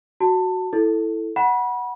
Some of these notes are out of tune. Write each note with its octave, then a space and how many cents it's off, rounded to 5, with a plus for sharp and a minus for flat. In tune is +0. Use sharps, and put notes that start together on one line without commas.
F#4 +0 A5 +20
E4 +0 A4 +0
F#5 +0 B5 -30